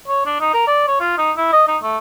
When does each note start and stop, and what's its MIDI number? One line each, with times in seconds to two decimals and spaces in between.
0.08 0.21 73
0.25 0.40 62
0.40 0.49 63
0.54 0.63 70
0.67 0.85 74
0.87 0.99 73
1.00 1.13 65
1.18 1.32 63
1.37 1.49 64
1.52 1.63 75
1.68 1.77 63
1.82 1.98 57